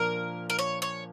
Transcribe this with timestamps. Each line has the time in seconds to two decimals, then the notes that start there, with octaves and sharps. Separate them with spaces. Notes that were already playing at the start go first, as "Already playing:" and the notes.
Already playing: A#2 F3 A#3 D4 A#4
0.50 A#4
0.59 C#5
0.82 C#5